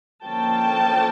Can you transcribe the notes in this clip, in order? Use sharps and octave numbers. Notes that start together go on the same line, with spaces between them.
D3 F3 A#3 C#4 G5 A5